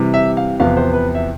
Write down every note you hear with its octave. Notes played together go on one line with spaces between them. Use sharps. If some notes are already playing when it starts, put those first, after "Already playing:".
Already playing: C3 E3 G3
E5
F5
E2 C3 F3 B3 F5
C5
B4
E5